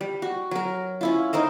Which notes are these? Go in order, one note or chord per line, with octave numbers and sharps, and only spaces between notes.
G3
F#4
F#3 A#4
C#4 E4 F4
D#4 A#4 C5 D#5